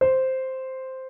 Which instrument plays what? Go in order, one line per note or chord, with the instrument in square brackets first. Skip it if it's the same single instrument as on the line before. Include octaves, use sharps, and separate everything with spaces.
[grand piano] C5